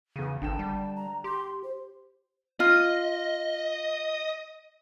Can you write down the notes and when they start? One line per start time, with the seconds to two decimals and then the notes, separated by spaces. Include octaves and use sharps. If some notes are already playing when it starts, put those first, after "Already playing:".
0.16 E2 C#3 D#7
0.42 G#1 D3 G5 A5 E7
0.59 G3
0.96 A#5
1.24 G4 C6
1.64 C5
2.60 F4 D#5